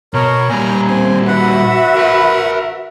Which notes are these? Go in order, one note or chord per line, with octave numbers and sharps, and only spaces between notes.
B2 A#4 C#5
A#2 G3 G#5 A#5
C4 G#5
F#4 B4 E5 F#5
A#4 B5